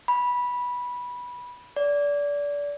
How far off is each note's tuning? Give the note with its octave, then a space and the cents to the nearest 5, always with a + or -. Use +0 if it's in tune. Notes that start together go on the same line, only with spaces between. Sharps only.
B5 -10
D5 -25